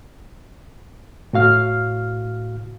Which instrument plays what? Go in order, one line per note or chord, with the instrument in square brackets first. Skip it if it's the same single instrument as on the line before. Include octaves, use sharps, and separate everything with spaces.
[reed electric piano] A2 F#4 F5 F6